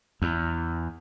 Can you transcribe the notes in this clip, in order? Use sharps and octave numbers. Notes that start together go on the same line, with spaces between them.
E2